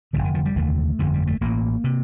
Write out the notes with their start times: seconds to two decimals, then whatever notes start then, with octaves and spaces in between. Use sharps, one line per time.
0.13 D#2 D3 G3
0.18 F1
0.24 D#3
0.35 F3
0.45 G3
0.56 F1 D#2 D3 A3
0.99 G1 F2 D3 F3
1.14 G3
1.27 A3
1.41 A1 A2 A#3
1.84 C3